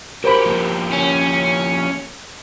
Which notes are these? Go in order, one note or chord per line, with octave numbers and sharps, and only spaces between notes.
F#4 G4 A#4 C5 B5
F3 A#3 G4
C#4